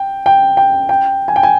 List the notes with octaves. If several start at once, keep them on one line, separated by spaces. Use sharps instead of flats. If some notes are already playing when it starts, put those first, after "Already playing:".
Already playing: G5
G5
G5
G5
G#5
G5
G#5